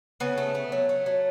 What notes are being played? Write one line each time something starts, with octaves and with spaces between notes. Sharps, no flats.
C#3 B3
A3
A3
F#3
A3
F#3